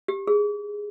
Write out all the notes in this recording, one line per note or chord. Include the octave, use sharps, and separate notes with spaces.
G4
G#4